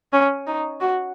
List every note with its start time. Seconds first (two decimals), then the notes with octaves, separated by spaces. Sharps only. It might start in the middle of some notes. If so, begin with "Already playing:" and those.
0.13 C#4
0.47 D#4
0.80 F#4